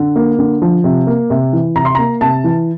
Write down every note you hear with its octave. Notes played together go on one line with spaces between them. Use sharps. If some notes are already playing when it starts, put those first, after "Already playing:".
Already playing: D3
A#3
D3
F3
C3
A#3
C3
E3
C3 A#5
C6
A#3 A#5
C3 A5
E3